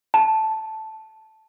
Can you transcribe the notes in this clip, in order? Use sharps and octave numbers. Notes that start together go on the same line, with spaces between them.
A5